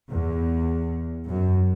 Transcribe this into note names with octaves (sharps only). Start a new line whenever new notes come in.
E2
F#2